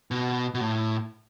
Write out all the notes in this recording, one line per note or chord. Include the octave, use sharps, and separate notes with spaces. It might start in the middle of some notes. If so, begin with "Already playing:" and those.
B2
B2
A2